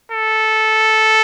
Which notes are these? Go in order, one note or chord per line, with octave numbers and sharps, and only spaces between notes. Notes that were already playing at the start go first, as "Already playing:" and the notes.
A4